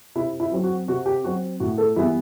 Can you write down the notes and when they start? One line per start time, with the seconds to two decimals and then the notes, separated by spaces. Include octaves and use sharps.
0.15 C3 E4
0.40 E4
0.52 F#3 C4
0.64 F#4
0.88 C3 F#4
1.06 G4
1.24 F#3 C4 F#4
1.60 A2 F#4
1.78 A4
1.96 E3 G3 B3 E4